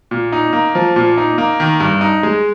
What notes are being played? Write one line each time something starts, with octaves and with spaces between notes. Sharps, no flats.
A#2
D#4
A#3
F3
A#2
D#4
A#3
D#3
G2
D#4
G#3